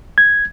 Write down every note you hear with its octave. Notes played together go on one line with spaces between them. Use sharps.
G#6